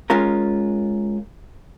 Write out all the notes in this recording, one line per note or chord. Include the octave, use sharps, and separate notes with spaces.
G#3 C#4 F4 A#4